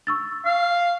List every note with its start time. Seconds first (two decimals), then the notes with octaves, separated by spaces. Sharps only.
0.07 C#6 E6 A6
0.45 F5